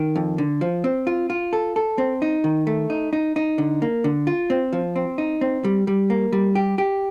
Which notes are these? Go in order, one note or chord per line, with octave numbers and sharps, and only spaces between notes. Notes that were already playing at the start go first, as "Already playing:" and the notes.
Already playing: D#3
F2
D3
F3
C4
F4
F4
A4
A4
C4
D#4
D#3
A3
D#4
D#4
D#4
D3
A#3
D3
F4
C4
F3
C4
D#4
C4
G3
G3
A#3
G3
G4
G4